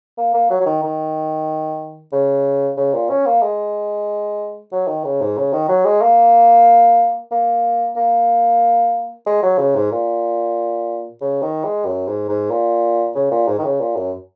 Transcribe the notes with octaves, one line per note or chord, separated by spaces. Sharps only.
A#3
A#3
F#3
F#3
D#3
D#3
C#3
C#3
A#2
C#4
A#3
G#3
F#3
D#3
C#3
G#2
C#3
D#3
F#3
G#3
A#3
A#3
A#3
G#3
F#3
C#3
G#2
A#2
C#3
D#3
G#3
F#2
G#2
G#2
A#2
C#3
A#2
G#2
D#3
C#3
A#2
F#2